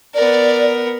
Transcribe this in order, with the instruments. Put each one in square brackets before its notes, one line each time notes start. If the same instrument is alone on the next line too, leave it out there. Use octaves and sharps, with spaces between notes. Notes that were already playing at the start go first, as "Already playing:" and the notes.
[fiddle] B3 A#4 [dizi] D5